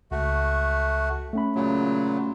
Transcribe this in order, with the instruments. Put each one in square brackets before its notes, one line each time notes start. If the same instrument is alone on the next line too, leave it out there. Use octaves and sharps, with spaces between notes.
[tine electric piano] C#2 [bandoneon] A3 F#4
[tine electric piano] A3 C#4 B5
[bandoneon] A#2 C#3 F#3